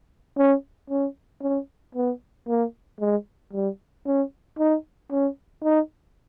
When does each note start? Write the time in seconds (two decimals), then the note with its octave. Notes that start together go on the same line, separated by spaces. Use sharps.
0.38 C#4
0.90 C#4
1.42 C#4
1.95 B3
2.48 A#3
3.00 G#3
3.53 G3
4.06 C#4
4.59 D#4
5.11 C#4
5.64 D#4